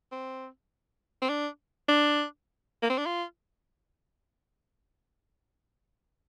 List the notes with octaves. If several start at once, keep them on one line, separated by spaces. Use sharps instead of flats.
C4
C4
D4
D4
A#3
C4
D4
F4